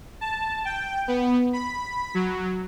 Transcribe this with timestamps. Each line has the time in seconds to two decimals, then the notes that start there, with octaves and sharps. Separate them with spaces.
0.21 A5
0.65 G5
1.08 B3
1.53 B5
2.14 F#3